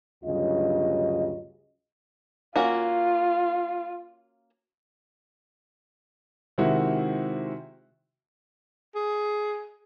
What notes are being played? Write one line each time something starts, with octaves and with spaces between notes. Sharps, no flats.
D2 G2 C#3 F#3 F4 D#5
A#3 C#4 F4 F#4
C3 D#3 G#3 C4 E4 F#4
G#4